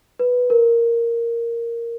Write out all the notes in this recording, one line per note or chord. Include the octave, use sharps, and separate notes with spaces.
B4
A#4